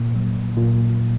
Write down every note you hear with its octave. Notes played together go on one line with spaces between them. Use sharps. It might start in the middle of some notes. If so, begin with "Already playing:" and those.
Already playing: A#2 A#3
F#3
A#2